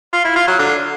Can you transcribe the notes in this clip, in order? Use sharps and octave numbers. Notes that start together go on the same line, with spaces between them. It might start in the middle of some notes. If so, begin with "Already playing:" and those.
F4
E4
F4
F#3
D3